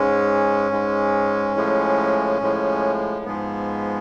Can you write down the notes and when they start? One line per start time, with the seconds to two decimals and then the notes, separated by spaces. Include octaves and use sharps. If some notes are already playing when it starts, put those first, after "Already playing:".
Already playing: G#2 G#3 C#4
0.72 G#2 G#3
1.56 A2 F3 G#3
2.41 A2 F3 G#3
3.25 G#2 F3 G#3 B3